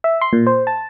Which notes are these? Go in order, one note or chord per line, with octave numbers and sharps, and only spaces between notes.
E5
C6
A#2
C5
A5